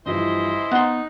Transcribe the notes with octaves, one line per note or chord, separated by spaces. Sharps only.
G2 C#3 E3 F3 E4 C5 D#5
B3 D#4 A#5 C6 F#6